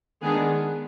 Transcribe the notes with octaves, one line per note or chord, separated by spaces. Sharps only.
D#3 G#3 B3 D4 G#4